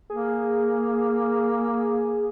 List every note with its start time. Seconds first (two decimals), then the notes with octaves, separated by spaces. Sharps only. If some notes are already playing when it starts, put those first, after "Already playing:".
0.10 A#3 G#4